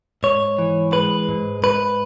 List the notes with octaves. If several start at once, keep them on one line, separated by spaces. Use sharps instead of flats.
G#2 C#5
E3
G#3 B4
G#2
G#2 B4